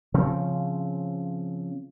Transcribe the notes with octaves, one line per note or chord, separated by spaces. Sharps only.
C#3 F3 C4 C#4